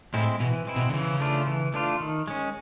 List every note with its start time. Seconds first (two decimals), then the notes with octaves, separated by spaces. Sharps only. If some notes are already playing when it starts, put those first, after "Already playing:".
0.14 A2 G#3 C4 E4
0.40 B2 E3
0.67 G#3 C4 E4
0.76 B2
0.89 D3
0.94 C#3 E3
1.20 A3 D4 F4
1.47 E3
1.74 A3 D4 F4
2.00 D#3
2.28 G#3 C#4